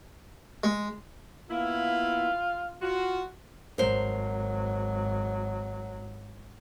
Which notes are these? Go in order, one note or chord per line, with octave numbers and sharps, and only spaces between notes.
G#3
A#3 B3 E4 F4
F4 F#4
G#1 F#3 A#4 C5